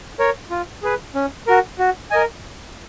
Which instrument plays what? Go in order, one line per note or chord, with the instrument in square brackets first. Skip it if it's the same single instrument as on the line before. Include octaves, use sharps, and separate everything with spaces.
[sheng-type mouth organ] A#4 C#5
F4
G#4 B4
C#4
F#4 A#4
F#4
A#4 D#5 G#5